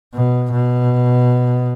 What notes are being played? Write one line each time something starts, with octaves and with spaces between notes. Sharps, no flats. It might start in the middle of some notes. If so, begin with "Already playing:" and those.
B2
B2